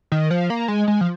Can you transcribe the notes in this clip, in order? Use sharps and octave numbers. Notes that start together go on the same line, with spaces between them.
D#3
F3
A#3
G#3
G#3
F3